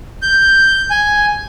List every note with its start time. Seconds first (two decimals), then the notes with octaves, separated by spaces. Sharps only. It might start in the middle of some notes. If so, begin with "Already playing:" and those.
0.22 G6
0.90 G#5